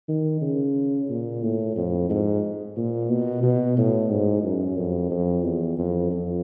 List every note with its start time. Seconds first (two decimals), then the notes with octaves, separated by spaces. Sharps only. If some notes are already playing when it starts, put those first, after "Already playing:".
0.09 D#3
0.41 C#3
1.09 A#2
1.42 A2
1.76 F2
2.10 G#2
2.77 A#2
3.10 B2
3.43 B2
3.77 A2
4.11 G#2
4.43 F#2
4.77 F2
5.11 F2
5.44 E2
5.78 F2
6.11 F2